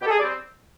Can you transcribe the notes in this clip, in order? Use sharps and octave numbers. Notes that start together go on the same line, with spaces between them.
B2 G4 A4
G#4
G3 C4 D5